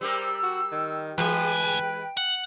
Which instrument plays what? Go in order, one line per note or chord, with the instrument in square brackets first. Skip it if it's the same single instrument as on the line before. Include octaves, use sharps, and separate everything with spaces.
[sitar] G3 G4 A#4 [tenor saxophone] C5 [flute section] E6
[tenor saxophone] F#4
D#3
[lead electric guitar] D2 G#5 [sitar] E3 G#3 [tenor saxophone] B4 [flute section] G5
[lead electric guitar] F#5